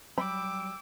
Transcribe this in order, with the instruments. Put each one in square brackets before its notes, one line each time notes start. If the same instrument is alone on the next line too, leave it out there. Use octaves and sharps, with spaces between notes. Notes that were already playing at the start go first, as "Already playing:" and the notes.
[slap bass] F#3 G3 [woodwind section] G5 E6 [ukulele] B5 [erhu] D6